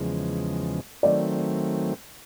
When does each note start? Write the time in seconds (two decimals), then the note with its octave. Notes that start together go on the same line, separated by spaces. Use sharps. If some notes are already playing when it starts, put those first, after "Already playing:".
Already playing: E2 C#3 F3 G#3
1.03 D#3 F#3 A3 C4 D5